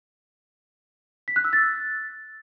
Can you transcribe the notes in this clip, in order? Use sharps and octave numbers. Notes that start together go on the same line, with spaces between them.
B6
F#6
E6
A6